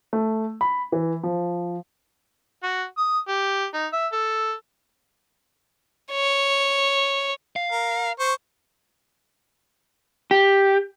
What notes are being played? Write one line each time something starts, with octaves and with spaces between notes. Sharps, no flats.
A3
B5
E3
F3
F#4
D#6
G4
D#4
E5
A4
C#5
F5
A#4
C5 C#6
G4